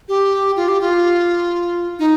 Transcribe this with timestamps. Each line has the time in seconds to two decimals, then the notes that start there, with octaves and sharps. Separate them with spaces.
0.08 G4
0.56 F4
0.68 G4
0.81 F4
1.99 D#4